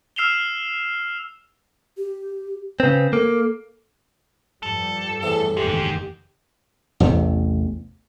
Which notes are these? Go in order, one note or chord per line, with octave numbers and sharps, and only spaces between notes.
E6 F6 C7 E7 F7 G7
G4
C#3 C4 B4
A#3 A4
G2 F3 G3 A4
E2 A2 C3 E3
F#1 E2 G#2 D#3 G4
A1 E2 C3 A3